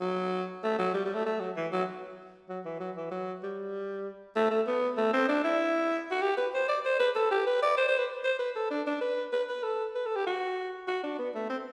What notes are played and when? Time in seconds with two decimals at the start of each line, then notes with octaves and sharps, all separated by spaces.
0.01 F#3
0.64 A3
0.79 F#3
0.94 G3
1.05 G3
1.15 A3
1.26 A3
1.40 F#3
1.56 E3
1.72 F#3
2.49 F#3
2.65 E3
2.80 F#3
2.97 E3
3.11 F#3
3.43 G3
4.36 A3
4.51 A3
4.67 B3
4.97 A3
5.13 C4
5.29 D4
5.44 E4
6.11 F#4
6.22 G4
6.37 B4
6.54 C5
6.68 D5
6.85 C5
6.99 B4
7.16 A4
7.31 G4
7.47 B4
7.62 D5
7.77 C5
7.88 C5
7.98 B4
8.24 C5
8.39 B4
8.56 A4
8.71 D4
8.87 D4
9.01 B4
9.33 B4
9.49 B4
9.63 A4
9.95 B4
10.06 A4
10.16 G4
10.27 F#4
10.88 F#4
11.03 D4
11.19 B3
11.35 A3
11.50 C4